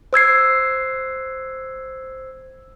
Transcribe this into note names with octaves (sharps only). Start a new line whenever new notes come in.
C5 E6 G#6 C7